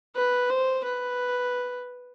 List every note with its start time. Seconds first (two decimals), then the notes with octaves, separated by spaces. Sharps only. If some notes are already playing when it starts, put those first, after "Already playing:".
0.16 B4
0.50 C5
0.84 B4